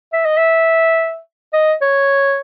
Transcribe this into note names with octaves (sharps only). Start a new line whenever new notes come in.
E5
D#5
E5
D#5
C#5